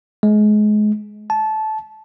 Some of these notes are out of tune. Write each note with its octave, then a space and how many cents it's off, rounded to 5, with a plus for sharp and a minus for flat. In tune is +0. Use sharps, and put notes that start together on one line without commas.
G#3 +30
A5 -15